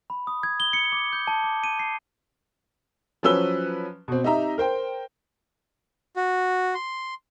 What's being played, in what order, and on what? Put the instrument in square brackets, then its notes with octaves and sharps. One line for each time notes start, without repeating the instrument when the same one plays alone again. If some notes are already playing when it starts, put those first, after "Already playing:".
[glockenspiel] B5
D#6
G#6
G7
C#7
D6
G6
A5
D6
D#7
C7
[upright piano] F3 F#3 C#4 B4 E6 G7
B2 C4
C4 D#4 G4 E5 A#5
A#4 C5 G5
[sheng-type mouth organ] F#4
C6